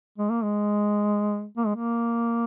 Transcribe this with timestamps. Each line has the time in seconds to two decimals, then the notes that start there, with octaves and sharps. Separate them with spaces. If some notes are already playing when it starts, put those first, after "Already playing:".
0.18 G#3
0.30 A#3
0.43 G#3
1.57 A#3
1.66 G#3
1.75 A#3